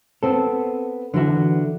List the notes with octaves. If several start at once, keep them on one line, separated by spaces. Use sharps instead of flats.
B3 C4 A4
D3 E3 F#4 E5